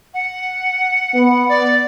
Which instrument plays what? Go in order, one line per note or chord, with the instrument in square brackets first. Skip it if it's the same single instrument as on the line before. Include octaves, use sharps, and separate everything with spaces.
[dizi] F#5
[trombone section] B3
[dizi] D5